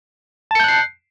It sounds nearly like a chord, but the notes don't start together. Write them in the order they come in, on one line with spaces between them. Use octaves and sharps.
A5 C#7 G6 F#6 C7